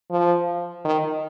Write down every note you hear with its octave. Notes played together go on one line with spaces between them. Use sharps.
F3
D#3